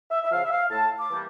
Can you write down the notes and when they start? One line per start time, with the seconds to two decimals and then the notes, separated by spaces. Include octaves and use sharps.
0.11 E5
0.22 E5
0.31 C#3 F3 F5
0.44 E5
0.50 F5
0.70 A2 A5
0.97 D6
1.09 E3 G3 A#3